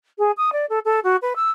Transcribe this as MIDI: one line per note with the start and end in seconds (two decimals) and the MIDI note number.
0.18 0.31 68
0.37 0.50 87
0.52 0.66 74
0.69 0.79 69
0.85 1.00 69
1.04 1.16 66
1.22 1.33 71
1.36 1.50 88